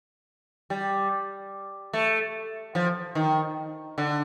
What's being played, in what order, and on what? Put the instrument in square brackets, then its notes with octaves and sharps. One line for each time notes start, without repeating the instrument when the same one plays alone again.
[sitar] G3
A3
F3
D#3
D3